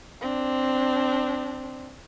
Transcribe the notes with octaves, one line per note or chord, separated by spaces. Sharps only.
C4 D4